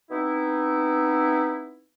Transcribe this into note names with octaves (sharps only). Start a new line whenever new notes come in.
B3 C4 D#4 E4